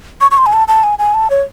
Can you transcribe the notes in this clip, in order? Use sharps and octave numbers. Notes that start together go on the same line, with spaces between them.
C#6
C#6
C6
G#5
A5
A5
G#5
G#5
A5
C#5